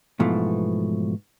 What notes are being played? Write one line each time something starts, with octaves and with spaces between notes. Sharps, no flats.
G#2 B2 E3 F3 A3